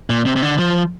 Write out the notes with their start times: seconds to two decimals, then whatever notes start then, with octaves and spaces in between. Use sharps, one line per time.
0.10 A#2
0.26 C3
0.36 C3
0.42 D3
0.59 F3